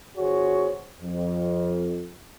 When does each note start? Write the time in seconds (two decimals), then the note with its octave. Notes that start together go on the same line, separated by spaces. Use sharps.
0.18 G1 F#4 G#4 C5 C#5
1.01 F2